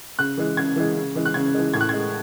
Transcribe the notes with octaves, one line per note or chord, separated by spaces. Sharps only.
C#3 F#6
E3 G#3
C#3 G#6
E3 G#3
C#3
E3 G#3
F#6
C#3 G#6
E3 G#3
A2 G#6
F#6
G#3 G#6